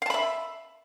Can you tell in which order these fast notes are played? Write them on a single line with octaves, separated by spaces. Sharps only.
F5 A5 B5 E5